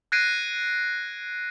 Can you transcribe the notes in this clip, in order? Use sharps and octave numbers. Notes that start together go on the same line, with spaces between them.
F#6 G#6 A#6 C7 D7 D#7